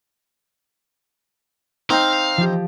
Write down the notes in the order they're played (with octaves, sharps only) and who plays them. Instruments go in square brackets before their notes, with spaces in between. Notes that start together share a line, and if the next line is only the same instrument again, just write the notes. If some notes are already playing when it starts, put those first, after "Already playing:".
[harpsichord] C4 D#4 [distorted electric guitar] F5
[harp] F3 G4